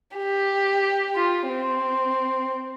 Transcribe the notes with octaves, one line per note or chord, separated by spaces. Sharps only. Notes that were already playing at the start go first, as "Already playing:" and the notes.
G4
F4
C4